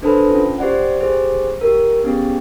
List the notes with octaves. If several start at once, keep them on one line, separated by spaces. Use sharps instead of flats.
D4 A4 B4 C5 A5 B5
C#4 F4
G4 C5 D5 F#5
G4 G#4 C5
G4 A#4
B3 C#4 G4 G#4